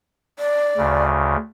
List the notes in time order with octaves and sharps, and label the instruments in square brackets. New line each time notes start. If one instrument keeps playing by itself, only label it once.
[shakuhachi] D5
[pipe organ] D2 C#3